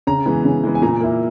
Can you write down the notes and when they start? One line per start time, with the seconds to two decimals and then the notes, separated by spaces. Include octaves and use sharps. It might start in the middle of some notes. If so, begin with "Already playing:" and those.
0.07 C#3 A#5
0.26 E3 G#3 B3
0.45 C#3
0.64 E3 G#3 B3
0.75 G#5
0.82 A#2 A#5
1.01 A#3 E4